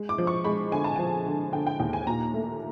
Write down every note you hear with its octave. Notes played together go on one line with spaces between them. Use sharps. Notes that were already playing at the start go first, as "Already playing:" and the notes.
Already playing: G#3
D6
F3
C#6
G#3 B5
D3 G#5
A5
F3 G#5
D3
D3 G5
G5
D#2 G5
G#5
A#2 A#5
A3